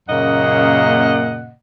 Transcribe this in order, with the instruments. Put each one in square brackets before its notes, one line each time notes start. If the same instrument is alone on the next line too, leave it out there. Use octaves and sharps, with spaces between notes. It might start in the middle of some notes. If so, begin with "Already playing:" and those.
[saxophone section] F#2 A#2 C#3 A#3 D#5 F#5